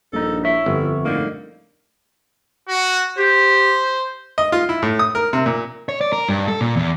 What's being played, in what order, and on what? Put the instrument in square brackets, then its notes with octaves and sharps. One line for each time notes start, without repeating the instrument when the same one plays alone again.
[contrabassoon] A#1 [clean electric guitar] G2 D#4 [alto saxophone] A4
[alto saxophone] E4 [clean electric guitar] C#5 E5
[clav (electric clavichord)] G1 [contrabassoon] F2
[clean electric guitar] A2 D3 D#4 [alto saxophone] A#3
[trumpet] F#4
[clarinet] G4 [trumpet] C5
[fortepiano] D#5
F4
E4
A2
D#6
A#4
C3
A#2
[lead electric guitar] C#5
D5
A#4
G2
A4
A#2
E2